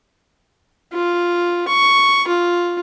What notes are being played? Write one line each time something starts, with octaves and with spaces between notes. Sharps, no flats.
F4
C#6
F4